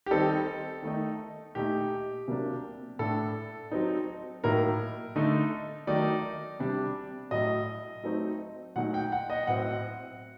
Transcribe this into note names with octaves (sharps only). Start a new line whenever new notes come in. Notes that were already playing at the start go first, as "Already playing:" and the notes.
G4
D#3 G3 C4 D#4 A4
D#3 A3 D#4
A#2 A3 D#4 G4
C3 F#3 A#3 D4
A2 A3 D4 A4
F#3 C4 D#4
A2 F#3 A#3 D#4 A#4
D3 A3 D#4
D#3 F#3 A3 D#4 D5
C3 G3 D4
A2 F#3 A3 D#5
F#3 A3 C4 D#4
A#2 F#3 A3 D#4 F#5
G5
F#5
D#5
A2 F#3 C4 F#5